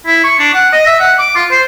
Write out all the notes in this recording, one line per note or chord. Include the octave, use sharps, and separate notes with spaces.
E4
C#6
D4
F#5
D#5
E5
F#5
D6
F4
C5